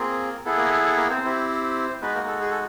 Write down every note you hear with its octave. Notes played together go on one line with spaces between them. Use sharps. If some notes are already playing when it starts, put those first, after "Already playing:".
Already playing: A#3 C4 F4 G#4 A#4
B3 E4 G#4 A4
A#3 A#4
A4
A4
A#3 A#4
C4 C5
C4 E4 G4
G#3 B3 D#4 F#4 B4
A#3 A#4
A4
G#4
A4